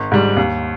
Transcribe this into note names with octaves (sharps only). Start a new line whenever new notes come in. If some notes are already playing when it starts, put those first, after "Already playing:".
Already playing: G#1
G#2 G3
D#2